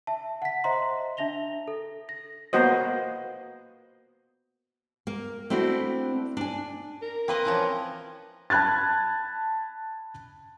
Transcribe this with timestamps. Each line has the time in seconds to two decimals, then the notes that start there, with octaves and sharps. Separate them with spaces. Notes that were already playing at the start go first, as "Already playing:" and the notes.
0.07 E5 A5
0.42 F#5 B6
0.64 C5 D#5 E5 A#5 C6
1.17 D4 E5 A5 A#6 F7 G7
1.68 A4
2.09 A#6
2.53 A#3 B3 F#4 C5 D#5
5.07 A#3
5.50 A3 C4 D4 E4 F#4
6.37 D4 G#5
7.02 A#4
7.28 A#3 C4 B4 D#5 C6
7.45 E3 F3 C#4
8.50 A5 B5 F#6 G#6 A6